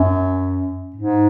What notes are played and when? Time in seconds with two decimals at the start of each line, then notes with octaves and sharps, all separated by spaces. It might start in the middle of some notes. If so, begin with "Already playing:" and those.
Already playing: F#2
0.96 G#2